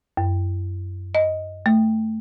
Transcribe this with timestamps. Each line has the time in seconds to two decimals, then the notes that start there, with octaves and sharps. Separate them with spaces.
0.17 F#2
1.15 D#5
1.66 A3